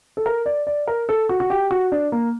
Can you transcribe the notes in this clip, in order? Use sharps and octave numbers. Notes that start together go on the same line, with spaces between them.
A4
A#4
D5
D5
A#4
A4
F#4
F#4
G4
F#4
D4
A#3